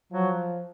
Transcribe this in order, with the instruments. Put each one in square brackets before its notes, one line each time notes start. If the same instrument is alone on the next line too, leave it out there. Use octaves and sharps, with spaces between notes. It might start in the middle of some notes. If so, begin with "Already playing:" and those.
[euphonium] F3 [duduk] F#3